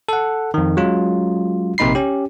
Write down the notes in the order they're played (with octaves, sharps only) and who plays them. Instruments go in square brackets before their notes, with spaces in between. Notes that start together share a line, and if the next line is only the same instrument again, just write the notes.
[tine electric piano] A4 F#5
F2 D#3
F#3 G#3 C#4 F4
A#1 C3 A#3 D#4 B5 C7
C#4 G4